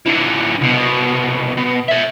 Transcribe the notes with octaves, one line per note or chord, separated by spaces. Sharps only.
D3 E3
C2 B2
B2
C#5 E5